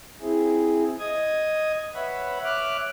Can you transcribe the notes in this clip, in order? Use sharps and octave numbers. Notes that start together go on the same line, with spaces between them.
C4 E4 G#4
D#5 D#6 G#6
B4 C#5 E5 F#5 B5
C#5 E5 D6 F6 F#6